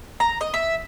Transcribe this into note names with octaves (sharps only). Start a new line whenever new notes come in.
A#5
D#5
E5